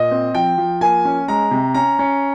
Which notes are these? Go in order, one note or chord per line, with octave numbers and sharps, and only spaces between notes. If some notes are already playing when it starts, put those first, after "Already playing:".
Already playing: A#2 D#5
C4
F3 G5
F3
A#3 G#5
C#4
G#3 A#5
C3
C#4 A#5
C#4